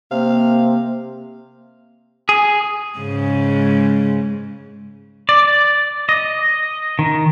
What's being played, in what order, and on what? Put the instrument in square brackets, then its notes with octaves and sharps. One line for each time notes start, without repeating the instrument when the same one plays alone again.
[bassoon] C3 [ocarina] A#3 [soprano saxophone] F5
[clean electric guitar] G#4
[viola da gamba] G#2 C#3 G#3
[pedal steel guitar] D5
D#5
D#3